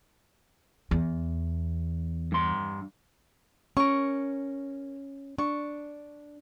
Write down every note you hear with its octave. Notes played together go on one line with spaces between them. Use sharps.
E2
G2 C6
C#4 A#4 C#6
D4 C#6